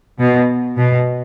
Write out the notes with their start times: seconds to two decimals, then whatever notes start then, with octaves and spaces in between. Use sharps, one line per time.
0.20 B2
0.78 B2